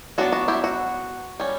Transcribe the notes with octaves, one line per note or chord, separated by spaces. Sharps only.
F#3 B3 D4 F#4
F#4
E4 G4
F#4
G3 C#4